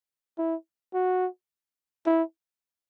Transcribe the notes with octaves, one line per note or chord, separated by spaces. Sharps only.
E4
F#4
E4